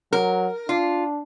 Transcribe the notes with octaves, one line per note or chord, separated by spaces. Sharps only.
F#3 A#4
D4 F4